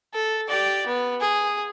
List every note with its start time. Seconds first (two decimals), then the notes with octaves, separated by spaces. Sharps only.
0.14 A4
0.48 G4 D5
0.87 B3
1.21 G#4